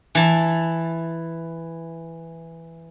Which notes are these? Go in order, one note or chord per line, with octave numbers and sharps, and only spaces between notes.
E3 A5